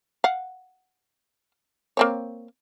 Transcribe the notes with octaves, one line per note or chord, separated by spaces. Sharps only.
F5 F#5
A#3 C4 C#5